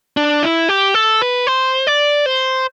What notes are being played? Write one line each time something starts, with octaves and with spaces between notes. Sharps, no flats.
D4
E4
G4
A4
B4
C5
D5
C5